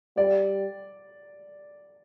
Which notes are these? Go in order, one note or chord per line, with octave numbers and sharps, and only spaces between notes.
G3 D5